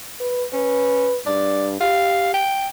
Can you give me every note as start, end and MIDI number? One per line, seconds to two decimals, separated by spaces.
0.20 0.44 71
0.53 1.09 61
0.53 1.17 71
1.26 1.78 43
1.26 1.68 74
1.81 2.40 67
1.81 2.33 77
2.34 2.67 79